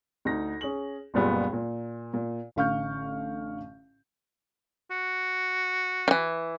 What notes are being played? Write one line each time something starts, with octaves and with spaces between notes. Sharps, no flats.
D2 D#4 A#6
C#4 G#4 F#7
F#1 C#2 A#2 G3 B3 F4
A#2
A#2
A1 D3 F5 C#6 F6 G6
F#4
D#3 E3